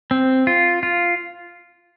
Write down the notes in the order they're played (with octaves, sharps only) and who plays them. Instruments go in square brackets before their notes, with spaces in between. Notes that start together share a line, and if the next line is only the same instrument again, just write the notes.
[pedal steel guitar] C4
F4
F4